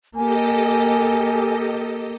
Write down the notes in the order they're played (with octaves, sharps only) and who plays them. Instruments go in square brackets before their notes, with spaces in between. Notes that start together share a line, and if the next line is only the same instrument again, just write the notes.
[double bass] A#3 [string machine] G4 A4 D#5 [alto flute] G#5